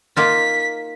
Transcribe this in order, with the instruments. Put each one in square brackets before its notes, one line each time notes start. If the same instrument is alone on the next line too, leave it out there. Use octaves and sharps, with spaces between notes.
[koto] A#3 D#4 F4 [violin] B6